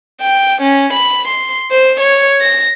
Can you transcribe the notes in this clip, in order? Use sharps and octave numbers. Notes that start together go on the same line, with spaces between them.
G5
C#4
B5
C6
C5
C#5
A#6